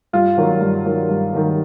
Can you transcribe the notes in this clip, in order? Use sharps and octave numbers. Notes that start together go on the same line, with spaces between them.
G2 F4
D#3 F#3 A#3
G2
D#3 F#3 A#3
G2
D#3 F#3 A#3